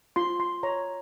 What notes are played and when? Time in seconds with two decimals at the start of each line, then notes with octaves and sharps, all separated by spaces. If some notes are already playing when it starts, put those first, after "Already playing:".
0.16 F4 C6
0.40 C6
0.63 C#5 A#5